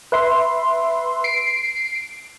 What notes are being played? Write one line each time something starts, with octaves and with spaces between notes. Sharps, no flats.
B4 E5 C6
C7 D7